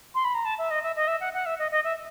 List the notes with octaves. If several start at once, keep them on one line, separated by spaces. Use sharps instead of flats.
C6
B5
A#5
A5
E5
D#5
E5
D#5
E5
F#5
F#5
E5
D#5
D#5
E5